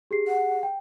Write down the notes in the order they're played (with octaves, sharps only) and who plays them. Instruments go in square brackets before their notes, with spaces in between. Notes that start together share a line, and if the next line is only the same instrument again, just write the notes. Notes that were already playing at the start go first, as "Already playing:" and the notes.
[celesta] G4 G#4 C7
[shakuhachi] F#5
[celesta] G5